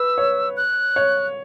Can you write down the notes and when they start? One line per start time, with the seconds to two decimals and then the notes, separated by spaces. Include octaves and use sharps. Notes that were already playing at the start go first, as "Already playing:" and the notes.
Already playing: B4 E6
0.18 C#5
0.57 F#6
0.96 C#5